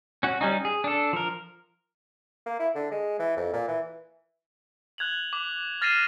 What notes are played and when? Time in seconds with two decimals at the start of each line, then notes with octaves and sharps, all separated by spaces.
0.23 C#4 F#4
0.41 G3 C#4 D#4
0.65 G#4
0.84 D4 A4
1.13 F3 A#4
2.46 A#3
2.59 E4
2.75 D3
2.91 G#3
3.19 E3
3.37 F2
3.53 A#2
3.68 E3
4.98 F#6 G#6 F7 F#7
5.33 D6 F7
5.81 F6 A6 A#6 C7 D#7 E7